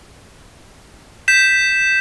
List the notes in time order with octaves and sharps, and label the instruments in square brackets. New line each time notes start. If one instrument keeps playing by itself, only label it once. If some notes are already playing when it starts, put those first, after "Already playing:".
[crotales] G6 B6 E7